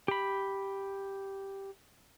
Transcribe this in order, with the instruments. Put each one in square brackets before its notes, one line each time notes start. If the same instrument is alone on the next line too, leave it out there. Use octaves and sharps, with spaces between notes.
[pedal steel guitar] G4 B5